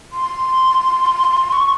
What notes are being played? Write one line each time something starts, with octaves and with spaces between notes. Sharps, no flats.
C6
C#6